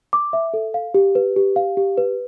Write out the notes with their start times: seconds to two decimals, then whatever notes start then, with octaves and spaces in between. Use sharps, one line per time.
0.13 D6
0.33 E5
0.54 A4
0.74 F5
0.94 G4
1.15 B4
1.36 G4
1.56 F5
1.77 G4
1.98 B4